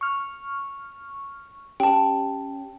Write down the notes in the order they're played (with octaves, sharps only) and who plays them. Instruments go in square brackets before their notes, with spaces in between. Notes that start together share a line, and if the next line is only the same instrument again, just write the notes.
[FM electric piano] C#6 F6
[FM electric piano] C#4 G4 [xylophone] G5 A5